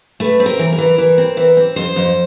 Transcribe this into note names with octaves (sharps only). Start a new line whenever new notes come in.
A3 B4
C4
A#4
E3
A#4
E3
E3
C4
E3
C4
F2 C5
F2